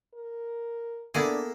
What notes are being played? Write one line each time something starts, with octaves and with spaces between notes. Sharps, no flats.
A#4
A#3 B3 D4 E4 G#4 A4